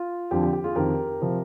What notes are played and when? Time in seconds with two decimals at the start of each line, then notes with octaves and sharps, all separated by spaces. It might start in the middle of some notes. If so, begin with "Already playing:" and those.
Already playing: F4
0.31 F2 D3 F3 G4
0.42 G4
0.53 G4
0.64 F4 G#4
0.75 F2 D#3 G4 A#4
1.21 C3 F3